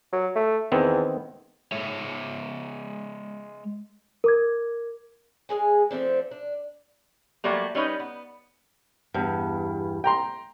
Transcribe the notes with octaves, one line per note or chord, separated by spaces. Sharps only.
F#3
A3
E2 D#3 B3 C4
G#3 C#5 E5
A#4 D6 G#6
G#3 C4 G#4 G#5
F3 A3 C4 D4
D4
F#3 G3 A3 A#3
G3 C#4 D#4 B4
B3
E2 G2
G5 A#5 C6